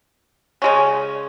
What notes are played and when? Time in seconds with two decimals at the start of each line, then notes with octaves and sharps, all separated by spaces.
0.62 C#3 G#3 C#4